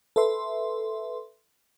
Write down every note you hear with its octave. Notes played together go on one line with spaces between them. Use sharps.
A4 B4 E5 C6